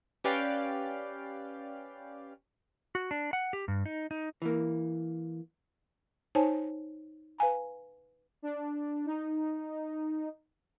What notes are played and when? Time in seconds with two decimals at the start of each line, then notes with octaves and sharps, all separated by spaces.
0.24 C#4 G4 B4 D5 F5 G5
2.95 F#4
3.11 D4
3.33 F#5
3.53 G4
3.68 G2
3.86 D#4
4.11 D#4
4.42 E3 A#3
6.35 D#4 C5 C#5 G#5 A5
7.38 B4 F5 G#5 A#5
8.42 D4
9.06 D#4